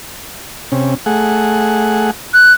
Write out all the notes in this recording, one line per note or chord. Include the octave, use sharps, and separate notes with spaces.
C3 C#4
A3 G#4 F#5
F#6